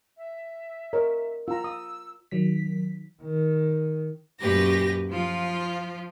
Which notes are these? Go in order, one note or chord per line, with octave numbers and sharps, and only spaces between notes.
E5
A#4 C#5 D#5
F4 A#5 E6
D#6
D#3 F#3 B6
D#3
F#2 A#2 G4 B4 A#6
F3 F4